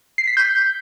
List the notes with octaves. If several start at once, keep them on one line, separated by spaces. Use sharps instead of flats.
C7
B6
G6